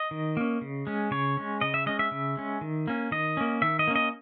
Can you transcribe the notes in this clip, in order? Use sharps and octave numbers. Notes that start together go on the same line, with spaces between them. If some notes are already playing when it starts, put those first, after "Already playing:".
Already playing: D#5
D#3
A#3 C#4
C#3
G#3 C#4
C#3 C#5
G#3 C#4
C#3 D#5
E5
G#3 C#4 D#5
E5
C#3
G#3 C#4
D#3
A#3 C#4
D#3 D#5
A#3 C#4
D#3 E5
D#5
A#3 C#4
D#5